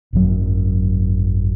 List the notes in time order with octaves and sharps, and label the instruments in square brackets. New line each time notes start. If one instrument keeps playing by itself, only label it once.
[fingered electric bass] G#1 F#2 D#3 F#3